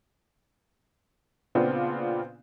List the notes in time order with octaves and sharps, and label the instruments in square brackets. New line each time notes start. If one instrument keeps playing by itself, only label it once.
[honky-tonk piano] A#2 C#3 B3 C4 D4 F4